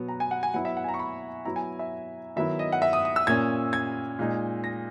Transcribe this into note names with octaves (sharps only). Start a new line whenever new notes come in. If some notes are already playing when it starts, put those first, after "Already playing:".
Already playing: B2 F#3 B3
A#5
G#5
F#5
G#5
F#3 B3 E4 F#5
E5
F#5
G#5
A#5
C#6
B5
F#3 B3 E4 A#5
G#5
E5
D#3 F#3 B3 E4 E5
D#5
F#5
E5
D#6
D#6
E6
A#2 A#3 C#4 G#6
G#6
A#2 G#3 D#4
A#6